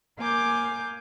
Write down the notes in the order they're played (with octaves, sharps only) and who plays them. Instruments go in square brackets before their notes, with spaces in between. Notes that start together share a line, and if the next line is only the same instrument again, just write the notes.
[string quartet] A#3 F5 G#5 D6 G6